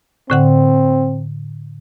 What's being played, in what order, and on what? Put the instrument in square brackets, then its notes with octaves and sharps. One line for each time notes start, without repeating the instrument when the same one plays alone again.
[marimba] A2 D3 F#5 [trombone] C4